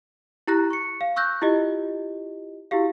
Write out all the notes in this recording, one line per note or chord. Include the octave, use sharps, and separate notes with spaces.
E4 G4 A#5 F#6 A#6
C#6 C#7
F5
C#6 E6 F#6 G6 A#6
E4 F4 G4 D#5
E4 F#4 G4 F5